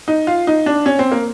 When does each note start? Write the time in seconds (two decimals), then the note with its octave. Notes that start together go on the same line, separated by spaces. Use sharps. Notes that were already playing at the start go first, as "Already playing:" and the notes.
0.08 D#4
0.27 F4
0.47 D#4
0.66 D4
0.86 C#4
0.99 C4
1.11 A#3